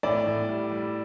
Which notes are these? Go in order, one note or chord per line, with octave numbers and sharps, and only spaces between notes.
A2 D5
A2
G3
G3